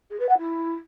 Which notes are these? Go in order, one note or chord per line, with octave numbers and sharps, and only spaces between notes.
G#4
B4
F#5
E4